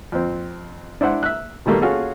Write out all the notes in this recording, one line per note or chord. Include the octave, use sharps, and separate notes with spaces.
F2 C4
D4 E4 C5 F#5
E5 F#6
B2 D#3 G3 A3 A#3
C#4 F4 F#4 G#4 A4